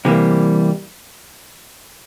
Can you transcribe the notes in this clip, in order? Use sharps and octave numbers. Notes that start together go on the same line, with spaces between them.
C3 E3 G3 A#3